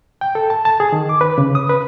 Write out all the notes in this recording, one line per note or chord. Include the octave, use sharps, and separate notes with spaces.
G5
A4
A5
A5
G#4
D#3
D6
B4
C#3
D#6
B4